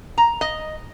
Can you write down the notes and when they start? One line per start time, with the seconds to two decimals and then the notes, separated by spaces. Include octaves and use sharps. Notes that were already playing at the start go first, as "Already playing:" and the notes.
0.18 A#5
0.41 D#5